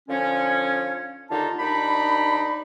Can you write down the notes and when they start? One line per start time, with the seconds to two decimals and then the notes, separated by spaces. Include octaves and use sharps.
0.09 D3 F3 C#4
1.30 D#2 D3 D#4 F4 A5
1.58 D#2 D4 D#4 B5